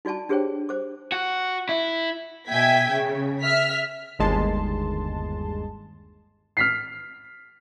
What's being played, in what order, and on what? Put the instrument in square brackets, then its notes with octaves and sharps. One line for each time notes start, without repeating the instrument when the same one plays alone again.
[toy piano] D#4 F#4 D5 G#5 A5
D4 G4 G#4 C5 C#5 G5
C5 D6
[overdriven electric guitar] F#4
E4
[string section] B2 E5 G5 G#5 G#6 B6
C#3
E5 F6 B6
[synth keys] G1 D#2 G#3 A5 C6
[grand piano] F6 B6 C7